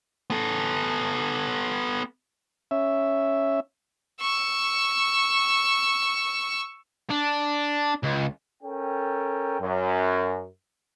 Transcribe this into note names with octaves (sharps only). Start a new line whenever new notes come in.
B3 A4
C#4 E5
C#6 E6
D4
C#2
C#4 A4 A#4 G5
F#2